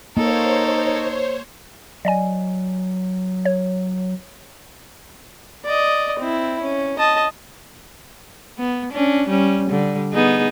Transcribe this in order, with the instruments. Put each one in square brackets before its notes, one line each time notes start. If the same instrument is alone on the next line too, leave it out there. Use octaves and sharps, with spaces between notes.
[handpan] A#3 [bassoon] D#4 [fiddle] A4 A#4 [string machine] C5 C#5
[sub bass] F#3 [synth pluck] D5 D#5 G#5
[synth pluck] C#5
[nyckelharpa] D5 D#5
C4 E4
C#4
D#5 A5
[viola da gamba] B3
C#4 D4
G3 C#4
D3 G3
B3 D#4 G#4